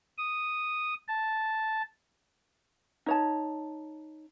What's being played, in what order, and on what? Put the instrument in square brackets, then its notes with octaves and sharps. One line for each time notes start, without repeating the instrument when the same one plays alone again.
[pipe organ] D#6
A5
[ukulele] D#4 C#5 A5